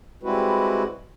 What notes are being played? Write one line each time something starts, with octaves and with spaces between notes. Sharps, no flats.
G3 G#3 C4 E4 F#4 B4